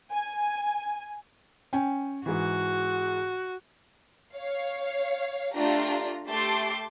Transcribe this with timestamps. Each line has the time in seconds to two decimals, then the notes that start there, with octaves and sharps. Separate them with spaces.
0.12 G#5
1.73 C#4 G5 G#5
2.26 G#2 E3 F#4
4.34 C#5 F5
5.56 A3 D4 F4 G4 A#5
6.28 A3 G4 A5 C6 D6 C7